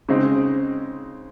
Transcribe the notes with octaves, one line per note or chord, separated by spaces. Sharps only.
C#3 G#3 C4 D#4